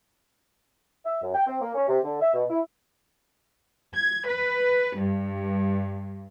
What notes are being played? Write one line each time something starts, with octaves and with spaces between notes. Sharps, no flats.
E5
F#2
G5
C4
A#3
C#4
C3
D3
E5
B2
E4
G#6
B4
G2